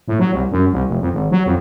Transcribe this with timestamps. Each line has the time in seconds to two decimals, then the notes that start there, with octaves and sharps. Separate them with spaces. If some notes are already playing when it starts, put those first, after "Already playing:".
0.08 A2
0.19 F#3
0.33 C2
0.52 F#2
0.72 C2
0.88 F1
1.01 F2
1.12 G#1
1.31 F#3
1.46 F2